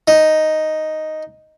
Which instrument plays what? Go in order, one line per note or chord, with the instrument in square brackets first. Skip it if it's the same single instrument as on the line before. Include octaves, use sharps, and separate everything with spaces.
[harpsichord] D#4